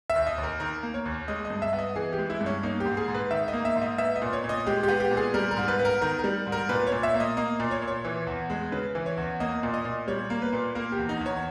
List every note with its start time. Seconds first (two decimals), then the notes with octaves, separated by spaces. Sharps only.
0.10 E5
0.15 D#2
0.27 D#5
0.38 D#2
0.43 A#4
0.60 D#3 A#4
0.83 A#3
0.94 C#5
1.05 D#2
1.28 G#3 D#5
1.45 D#5
1.50 G2
1.62 E5
1.73 B3
1.79 D#5
1.96 E3 G#4
2.13 G4
2.18 G#3
2.30 E4
2.41 G2
2.46 C#4
2.63 A#3 D#4
2.80 G4
2.86 G#2
2.97 G#4
3.08 G#2
3.14 B4
3.31 D#3 E5
3.48 D#5
3.53 A#3
3.65 E5
3.76 G#2
3.82 D#5
3.98 B3 E5
4.16 D#5
4.22 A#2
4.33 C#5
4.44 A#2
4.49 D#5
4.67 G#3 G4
4.83 G4
4.88 B3
5.00 G4
5.11 A#2
5.17 G#4
5.34 G3 A#4
5.51 A#4
5.57 G#2
5.68 B4
5.79 B3
5.85 A#4
6.01 D#3 A#4
6.19 A#4
6.24 G3
6.47 G#2
6.52 A#4
6.69 A#2 B4
6.87 A#2 C#5
7.03 E5
7.14 A#3
7.20 D#5
7.37 A#3 D#5
7.60 A#2
7.71 C#5
7.82 A#2
7.87 C#5
8.04 E3
8.27 E2
8.50 G#3
8.72 C#3 B4
8.95 E3
9.06 C#5
9.18 E2
9.40 A#3 D#5
9.63 A#2
9.74 D#5
9.85 A#2
10.08 G3 C#5
10.30 A#3
10.42 B4
10.53 A#2
10.75 A#3 A#4
10.92 G4
10.98 E2
11.09 D#4
11.21 E2
11.26 C#5